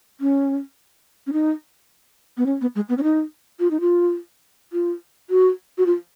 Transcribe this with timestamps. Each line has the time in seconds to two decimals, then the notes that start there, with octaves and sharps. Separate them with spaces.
0.20 C#4
1.27 C#4
1.33 D#4
2.37 B3
2.46 C#4
2.61 B3
2.75 G#3
2.89 B3
2.98 C#4
3.03 D#4
3.60 F4
3.71 D#4
3.80 F4
4.73 F4
5.30 F#4
5.78 F#4
5.86 F4